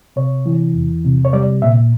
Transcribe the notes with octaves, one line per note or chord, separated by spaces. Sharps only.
C3 C#5
E3
E2
C3
C#5
G3 D5
A#2 E5